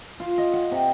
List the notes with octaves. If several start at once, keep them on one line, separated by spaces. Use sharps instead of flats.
F4
D#5
F#5
C3